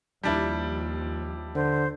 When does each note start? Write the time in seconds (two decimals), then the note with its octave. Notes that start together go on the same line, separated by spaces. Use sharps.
0.23 D#2 F3 G3 D4 E4
1.55 D3 C5